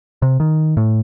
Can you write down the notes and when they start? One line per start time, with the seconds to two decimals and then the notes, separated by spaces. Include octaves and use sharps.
0.22 C3
0.40 D#3
0.77 A2